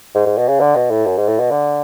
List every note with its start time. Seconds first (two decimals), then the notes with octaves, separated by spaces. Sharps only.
0.15 G#2
0.26 G#2
0.38 B2
0.49 C#3
0.60 D3
0.76 B2
0.91 A2
1.06 F#2
1.17 G#2
1.28 A2
1.40 B2
1.51 D3